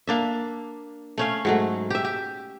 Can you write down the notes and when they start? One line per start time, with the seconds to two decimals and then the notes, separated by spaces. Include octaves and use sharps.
0.07 A#3 D4 E5
1.18 A3 C#4 F5
1.45 G#2 F#3 A3
1.90 G4 E5
2.05 G4